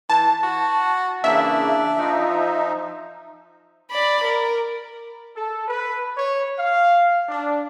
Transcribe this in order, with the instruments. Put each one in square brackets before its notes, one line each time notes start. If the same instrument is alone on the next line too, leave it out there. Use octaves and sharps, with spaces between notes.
[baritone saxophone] E3 [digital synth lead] A5
[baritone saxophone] F#4
[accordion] C#3 E3 A#3 [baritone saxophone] D4 [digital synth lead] E5
[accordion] F3 D#4
[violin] D5 B5
A#4
[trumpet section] A4
B4
C#5
F5
D4